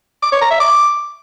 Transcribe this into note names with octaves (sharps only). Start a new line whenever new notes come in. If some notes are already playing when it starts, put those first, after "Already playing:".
D6
C#5
A#5
E5
D6